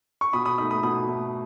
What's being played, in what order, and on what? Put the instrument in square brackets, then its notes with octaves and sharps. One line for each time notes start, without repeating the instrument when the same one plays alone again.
[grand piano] C#6
B2 B5 D#6
B5 D#6
D#4 B5 D#6
A3
B5 D#6
B2 B5 D#6
A3 D#4